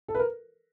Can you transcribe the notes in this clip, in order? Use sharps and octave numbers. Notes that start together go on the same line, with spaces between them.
A4
B4
A#4